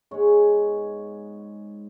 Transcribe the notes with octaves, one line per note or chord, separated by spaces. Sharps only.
G#2 G#3 B3 C#5